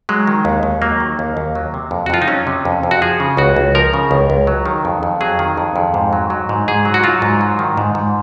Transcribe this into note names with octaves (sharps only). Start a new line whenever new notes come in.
F#3 G#3
D#3
D#2
D#2
F#3 A#3
D#3
D#2
D#2
F#3
C3
F2
F#4
F2 F4
D#4
F#3 C#4
C3
F2
F2
F#4
F3 G#4
C#3
C#2 F#4
C#2
F3 A#4
C#3
C#2
C#2
F#3
D#3
F2
F2
F#3 G#4
D#3
F2
F2
G#2
F#3
F#3
G#2
G#2 G#4
F#3
F#4
F#3 F4
G#2
F#3
D#3
G#2
G#2